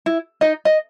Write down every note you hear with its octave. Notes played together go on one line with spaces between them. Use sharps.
E4
D#4 D#5
D#5